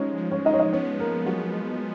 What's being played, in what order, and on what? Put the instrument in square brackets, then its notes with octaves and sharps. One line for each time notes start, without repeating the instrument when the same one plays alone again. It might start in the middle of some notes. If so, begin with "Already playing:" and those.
Already playing: [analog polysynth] F3 G#3 [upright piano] C#4 D#4 C#5
[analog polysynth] F3
[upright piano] C#4 C#5
[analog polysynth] G#3 [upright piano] D#4 D#5
[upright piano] C#5
D#4 D#5
[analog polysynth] B3 [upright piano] C#4 C#5
[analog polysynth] F3 [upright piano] A#3 A#4
[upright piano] F#3 F#4 [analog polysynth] B3